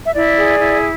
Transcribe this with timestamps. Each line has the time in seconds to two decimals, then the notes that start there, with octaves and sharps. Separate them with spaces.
0.04 E5
0.15 E4 D5
0.37 G#4
0.59 E4